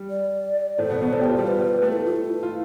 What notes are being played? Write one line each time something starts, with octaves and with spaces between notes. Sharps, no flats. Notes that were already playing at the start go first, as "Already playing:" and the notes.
Already playing: G3
D5
A2 A3 C5
B2 B3
B2 B3
A4 D5
G4 C5
F4
G3 G4 C5
B4
A3 A4 B4
E4
F4
E4
F4